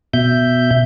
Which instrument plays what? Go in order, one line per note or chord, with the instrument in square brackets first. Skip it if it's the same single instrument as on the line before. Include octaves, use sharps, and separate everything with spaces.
[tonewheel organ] B2 E5 G6